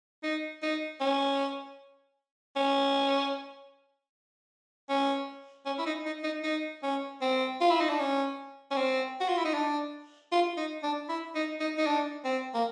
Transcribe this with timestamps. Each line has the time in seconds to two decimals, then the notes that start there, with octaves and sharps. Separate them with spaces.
0.23 D#4
0.63 D#4
1.01 C#4
2.56 C#4
4.89 C#4
5.66 C#4
5.79 E4
5.86 D#4
6.05 D#4
6.24 D#4
6.44 D#4
6.83 C#4
7.21 C4
7.61 F4
7.70 E4
7.80 D#4
7.89 D4
7.99 C#4
8.71 C#4
8.76 C4
9.20 F#4
9.29 F4
9.37 E4
9.45 D#4
9.54 D4
10.32 F4
10.57 D#4
10.83 D4
11.09 E4
11.35 D#4
11.60 D#4
11.78 D#4
11.87 D4
12.25 C4
12.54 A#3